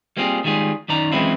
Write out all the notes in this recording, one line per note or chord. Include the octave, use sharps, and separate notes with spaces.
G3 A#3 C4 F4 G#4
D#3 G3 G#3 F4 G#4
F#2 D#3 D5 A#5
F#2 E3 G#3 C4 E4 F4